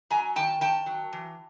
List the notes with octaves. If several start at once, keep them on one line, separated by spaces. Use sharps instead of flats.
F#3 G#5 A#5
D#3 G5 A5
D#3 G5 A5
F#3
E3